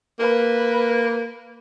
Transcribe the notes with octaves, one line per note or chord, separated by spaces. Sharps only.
A#3 B4